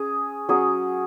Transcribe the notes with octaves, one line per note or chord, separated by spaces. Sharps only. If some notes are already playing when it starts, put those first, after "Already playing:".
Already playing: C#4 G#4
F#3 C#4 G#4